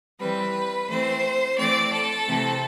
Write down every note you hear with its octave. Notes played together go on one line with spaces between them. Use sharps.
E3 G3 C4 B4
E3 A3 C4 C5
E3 A3 C4 D5
A4
C3 E3 A3 C4